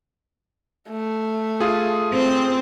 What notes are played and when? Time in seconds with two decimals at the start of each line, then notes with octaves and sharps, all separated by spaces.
0.89 A3
1.60 F4 G#4
2.12 C4